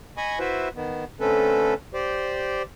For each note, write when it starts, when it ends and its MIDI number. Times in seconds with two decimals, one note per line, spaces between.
0.17 0.39 75
0.17 0.39 80
0.17 0.39 83
0.17 0.39 85
0.17 0.39 87
0.39 0.68 64
0.39 0.68 66
0.39 0.68 71
0.39 0.68 72
0.39 0.68 76
0.75 1.05 51
0.75 1.05 59
1.20 1.74 50
1.20 1.74 57
1.20 1.74 60
1.20 1.74 61
1.20 1.74 69
1.20 1.74 71
1.94 2.62 67
1.94 2.62 72
1.94 2.62 74